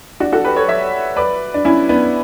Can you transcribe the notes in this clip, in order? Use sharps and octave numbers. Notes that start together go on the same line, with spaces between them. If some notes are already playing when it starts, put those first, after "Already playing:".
D4 F#4
F#4 A4
G4 B4
A4 C#5
C#5 E5
B4 D5
D4
C#4 E4
B3 D4